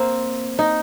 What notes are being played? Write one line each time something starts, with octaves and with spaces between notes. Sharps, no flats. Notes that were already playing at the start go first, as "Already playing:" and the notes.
Already playing: A#3 C4
D#4